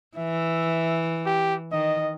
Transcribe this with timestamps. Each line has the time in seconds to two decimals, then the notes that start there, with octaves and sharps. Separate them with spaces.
0.17 E3 E5
1.26 G4
1.72 D#3 D#5